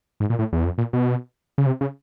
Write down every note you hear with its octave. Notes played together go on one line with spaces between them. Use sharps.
G#2
A#2
A2
E2
F2
A#2
B2
C#3
C3
C#3